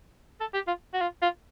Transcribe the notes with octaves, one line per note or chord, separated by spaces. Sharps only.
A4
G4
F4
F#4
F4
F4